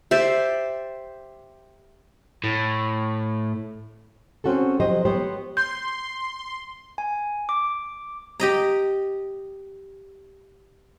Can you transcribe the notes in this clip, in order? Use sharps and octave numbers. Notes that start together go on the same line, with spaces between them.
G4 C5 D5 E5
A2
C4 C#4 F#4 G#4 A4
F3 F#3 G4 C5 D#5
B3 G4 C5 C#5
C6 G6
G#5
D6
G4 D#5 A#5